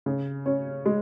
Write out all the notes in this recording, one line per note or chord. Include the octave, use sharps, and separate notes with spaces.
C#3
C#4
G#3